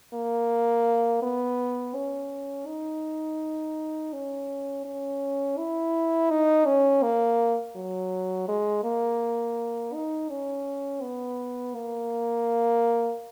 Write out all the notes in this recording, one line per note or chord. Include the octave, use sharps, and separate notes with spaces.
A#3
B3
C#4
D#4
C#4
C#4
E4
D#4
C#4
A#3
F#3
G#3
A#3
D#4
C#4
B3
A#3